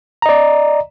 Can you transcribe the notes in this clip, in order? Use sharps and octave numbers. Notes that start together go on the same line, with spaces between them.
D5 D#5 A#5